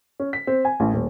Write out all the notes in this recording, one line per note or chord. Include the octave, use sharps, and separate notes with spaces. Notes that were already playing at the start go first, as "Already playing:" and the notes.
C#4
B6
C4
G#5
A1
D#1